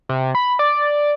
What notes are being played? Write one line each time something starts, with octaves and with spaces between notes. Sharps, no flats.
C3
B5
D5